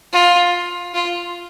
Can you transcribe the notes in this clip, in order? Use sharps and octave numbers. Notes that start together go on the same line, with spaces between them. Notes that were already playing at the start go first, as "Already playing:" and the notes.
F4
F4